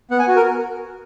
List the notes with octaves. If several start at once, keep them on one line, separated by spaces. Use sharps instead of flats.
B3 F#5
G#5
F#4
A#4